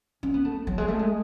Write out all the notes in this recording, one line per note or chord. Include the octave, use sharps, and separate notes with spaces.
C#4
B3
A3
F#3
G#3
A3
G#3